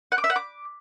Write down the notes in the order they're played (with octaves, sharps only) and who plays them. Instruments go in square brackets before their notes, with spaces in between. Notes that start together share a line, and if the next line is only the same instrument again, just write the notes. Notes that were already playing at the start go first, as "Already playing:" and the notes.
[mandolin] F#5
D6
E5
F#5
D6